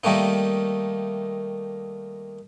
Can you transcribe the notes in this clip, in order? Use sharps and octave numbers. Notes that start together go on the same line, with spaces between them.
D#3 G3 A3 A#3 D#4